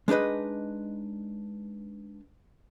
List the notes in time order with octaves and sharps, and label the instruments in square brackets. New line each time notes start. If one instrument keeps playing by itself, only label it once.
[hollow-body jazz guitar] G#3 D4 D#4 B4 D#5